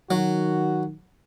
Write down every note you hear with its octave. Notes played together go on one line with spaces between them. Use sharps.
D#3 F#3 F#4